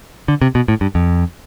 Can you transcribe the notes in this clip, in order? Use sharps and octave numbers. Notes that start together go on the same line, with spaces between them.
D3
C3
B2
A2
G2
F2